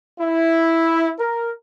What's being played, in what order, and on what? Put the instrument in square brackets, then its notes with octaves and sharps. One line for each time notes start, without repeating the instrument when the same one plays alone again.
[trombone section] E4
A#4